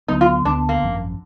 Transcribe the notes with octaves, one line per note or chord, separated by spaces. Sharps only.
D2 D3 F#3 B3 D#4
F4
D2 D3 F#3 D4
B3
A#3
G#1 F#2 F3